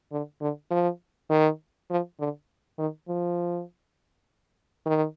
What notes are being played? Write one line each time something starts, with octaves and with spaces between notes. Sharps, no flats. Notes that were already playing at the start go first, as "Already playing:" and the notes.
D3
D3
F3
D#3
F3
D3
D#3
F3
D#3